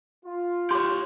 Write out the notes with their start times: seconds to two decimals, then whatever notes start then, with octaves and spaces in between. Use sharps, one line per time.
0.24 F4
0.71 G4 C#5 C6